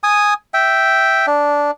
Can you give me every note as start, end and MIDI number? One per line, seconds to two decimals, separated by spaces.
0.03 0.34 80
0.03 0.34 87
0.54 1.26 76
0.54 1.26 79
1.27 1.71 62